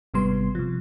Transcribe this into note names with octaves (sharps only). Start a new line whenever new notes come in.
G#1 C3 G3 B3 C6
C3 F3